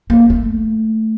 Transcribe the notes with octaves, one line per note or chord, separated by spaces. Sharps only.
A#3
A3